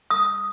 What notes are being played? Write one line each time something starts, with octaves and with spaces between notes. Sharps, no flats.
D#6